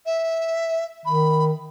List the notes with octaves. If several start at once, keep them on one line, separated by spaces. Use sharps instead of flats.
E5
D#3 B5